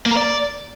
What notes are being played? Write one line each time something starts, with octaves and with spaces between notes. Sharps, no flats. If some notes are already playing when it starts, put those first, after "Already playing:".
A#3
A#4
D5